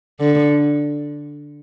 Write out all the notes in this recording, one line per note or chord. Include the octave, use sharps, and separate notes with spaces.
D3